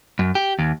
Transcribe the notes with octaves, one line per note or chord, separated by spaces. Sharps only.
F#2
G4
D#2